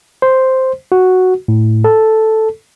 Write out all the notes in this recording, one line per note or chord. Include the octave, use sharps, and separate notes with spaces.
C5
F#4
A2
A4